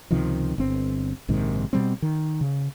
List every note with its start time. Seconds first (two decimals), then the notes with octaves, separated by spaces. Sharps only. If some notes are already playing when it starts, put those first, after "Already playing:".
0.11 C#2 C3 D#3 F3
0.58 G1 C4
1.29 A#1 G#2 C3 D#3
1.73 B2 G3 C4
2.02 D#3
2.41 C#3